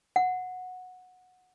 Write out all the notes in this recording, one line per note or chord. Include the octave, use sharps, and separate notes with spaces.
F#5